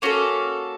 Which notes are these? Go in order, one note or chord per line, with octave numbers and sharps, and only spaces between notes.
A#3 C#4 F#4 A4